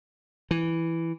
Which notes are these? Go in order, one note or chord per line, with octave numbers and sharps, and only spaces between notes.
E3